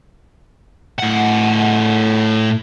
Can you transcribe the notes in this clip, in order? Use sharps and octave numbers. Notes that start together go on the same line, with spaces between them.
A2 F#5